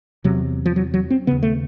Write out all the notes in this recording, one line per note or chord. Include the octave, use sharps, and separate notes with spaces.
E2 C3 F#3
F3
F#3
F#3
C4
D#2 C#3 B3
A3